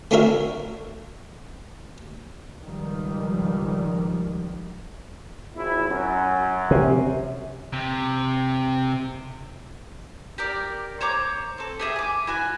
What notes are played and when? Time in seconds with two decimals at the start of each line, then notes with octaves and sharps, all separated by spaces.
0.11 A3 C#4 D4 F#4 A#4 E5
2.58 C#2 G#2 D#3 F3 G3
5.56 G#1 E4
5.89 F#2
6.71 C3
7.73 C3
10.38 G4 A#4 D5
11.01 C5 C#5 A#5 D6
11.58 C4 A4
11.80 G4 G#4 E5
11.96 G#5 D6
12.27 E4 F#4 G#5